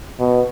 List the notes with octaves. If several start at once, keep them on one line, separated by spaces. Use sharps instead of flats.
B2